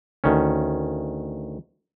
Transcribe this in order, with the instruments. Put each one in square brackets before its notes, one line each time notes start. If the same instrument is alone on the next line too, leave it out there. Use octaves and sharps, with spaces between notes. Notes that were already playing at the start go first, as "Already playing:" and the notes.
[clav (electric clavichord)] D2 D#3 C#4